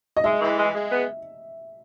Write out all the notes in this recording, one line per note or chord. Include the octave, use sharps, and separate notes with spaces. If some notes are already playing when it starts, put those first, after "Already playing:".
D#5
G#3 E5
E3
G#3
G#3
B3